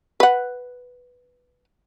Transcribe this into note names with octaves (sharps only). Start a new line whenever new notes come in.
B4 F#5